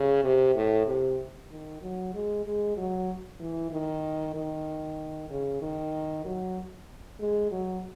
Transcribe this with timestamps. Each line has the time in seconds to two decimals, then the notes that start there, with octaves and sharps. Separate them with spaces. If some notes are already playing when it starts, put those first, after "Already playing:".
Already playing: C#3
0.23 C3
0.55 A2
0.87 C3
1.51 D#3
1.82 F#3
2.14 G#3
2.46 G#3
2.77 F#3
3.40 E3
3.71 D#3
4.35 D#3
5.30 C#3
5.62 D#3
6.25 F#3
7.20 G#3
7.51 F#3